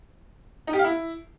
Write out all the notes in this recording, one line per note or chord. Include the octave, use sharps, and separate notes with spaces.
D#4
G4
F5
E4